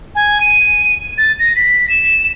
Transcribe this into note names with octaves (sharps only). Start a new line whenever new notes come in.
G#5
D#7
A6
A#6
B6
E7